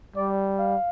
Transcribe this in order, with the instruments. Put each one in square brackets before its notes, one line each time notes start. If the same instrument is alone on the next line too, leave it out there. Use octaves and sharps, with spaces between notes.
[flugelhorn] G3 [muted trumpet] D5
[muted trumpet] F5